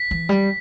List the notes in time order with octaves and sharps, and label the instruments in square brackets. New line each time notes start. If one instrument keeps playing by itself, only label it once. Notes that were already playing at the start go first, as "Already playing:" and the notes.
Already playing: [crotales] B6
[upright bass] E3
G3